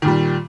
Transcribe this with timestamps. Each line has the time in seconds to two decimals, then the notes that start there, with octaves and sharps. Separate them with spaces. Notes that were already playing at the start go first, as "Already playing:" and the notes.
0.02 D#3
0.05 A#2
0.07 G3